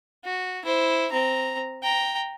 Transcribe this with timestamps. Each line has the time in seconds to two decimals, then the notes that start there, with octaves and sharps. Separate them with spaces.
0.25 F#4
0.65 E4 C5
1.11 C4 A#5
1.83 G5 A#5